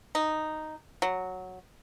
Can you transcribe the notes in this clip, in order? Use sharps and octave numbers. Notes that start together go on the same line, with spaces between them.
D#4
F#3